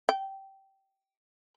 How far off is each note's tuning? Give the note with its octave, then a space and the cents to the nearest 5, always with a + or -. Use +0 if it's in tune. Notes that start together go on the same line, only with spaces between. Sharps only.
G5 -15